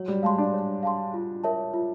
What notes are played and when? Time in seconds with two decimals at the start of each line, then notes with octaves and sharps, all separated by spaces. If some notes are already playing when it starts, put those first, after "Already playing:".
Already playing: F#3 C#5
0.08 G3
0.23 G#3 F5 A5 C6
0.38 D4
0.54 C#5
0.83 F5 A5 C6
1.14 F4
1.44 A#4 C#5 E5 A5
1.74 F4